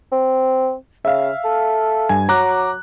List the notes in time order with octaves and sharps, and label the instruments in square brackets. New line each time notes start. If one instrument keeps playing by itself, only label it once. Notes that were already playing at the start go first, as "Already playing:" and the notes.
[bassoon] C4
[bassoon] C#3 [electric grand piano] E5 F5
[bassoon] A4
[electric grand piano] G2 G#5
[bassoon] F#3 [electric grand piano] A#5 D6 F#6